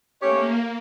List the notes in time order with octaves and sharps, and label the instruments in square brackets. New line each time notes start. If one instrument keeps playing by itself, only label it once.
[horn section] A3 C#4 G4 C#5 [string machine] A#3